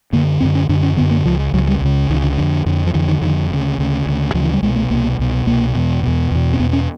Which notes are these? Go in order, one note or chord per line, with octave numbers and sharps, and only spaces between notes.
F#2 D3 A#3
F#2 D3 C4
C#4
F#2 D3 D4
C#4
F#2 D3 B3
A#3
C#2 C#3 F3
C#2 C#3 F#3
G3
C#2 C#3
C#2 C#3 D#3
D3
F2 D3
F2 D3
F3
F2 D3 E3
D#3
F2 D3 D#3
D2 C#3
D2 C#3
D2 C#3
D2 C#3 F3
E3
G3
C2 B2 G#3
A3
C2 B2 A#3
C2 B2
C2 B2 A#3
E2 B2
E2 B2
E2 B2
C4
E2 B2 B3
C#4